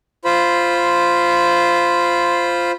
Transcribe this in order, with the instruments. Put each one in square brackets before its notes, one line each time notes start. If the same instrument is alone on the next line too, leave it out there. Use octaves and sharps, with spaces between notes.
[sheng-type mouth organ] F4 C5 B5